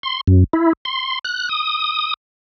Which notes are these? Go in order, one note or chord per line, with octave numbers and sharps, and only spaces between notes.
C6
F#2
E4
C6
F#6
D#6